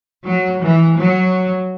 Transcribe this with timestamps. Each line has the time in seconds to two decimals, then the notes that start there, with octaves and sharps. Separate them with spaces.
0.24 F#3
0.61 E3
0.97 F#3